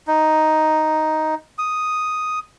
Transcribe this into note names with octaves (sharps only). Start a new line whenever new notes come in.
D#4
D#6